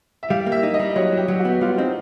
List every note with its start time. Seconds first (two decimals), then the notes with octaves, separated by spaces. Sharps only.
0.23 E5
0.30 G3 F5
0.46 A#3
0.52 E5
0.63 D#4
0.74 D#5
0.79 G3
0.96 F#3 C#5
1.12 E4
1.17 G4
1.28 F#3
1.40 F#4
1.45 B3
1.61 G3 F4
1.78 C4 D#4